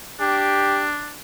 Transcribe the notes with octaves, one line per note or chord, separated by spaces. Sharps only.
D4 G4